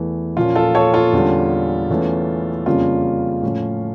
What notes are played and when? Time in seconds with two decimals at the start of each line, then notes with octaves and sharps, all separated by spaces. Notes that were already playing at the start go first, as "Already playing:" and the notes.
Already playing: E2 E3 A3
0.36 A#2 F3 A#3 C#4 F4
0.55 F4 A4
0.75 A4 C#5
0.94 F4 A4
1.13 E2 D3 G3 C#4
1.90 E2 E3 A3 C#4
2.66 F2 C#3 G3 A#3 C#4 F4
3.43 A2 F3 C#4